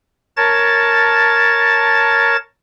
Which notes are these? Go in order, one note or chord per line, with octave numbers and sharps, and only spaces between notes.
A#4 C#5 A5 A6